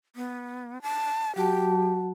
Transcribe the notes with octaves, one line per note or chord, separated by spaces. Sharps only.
B3
A5
F#3 F#4 G4 A5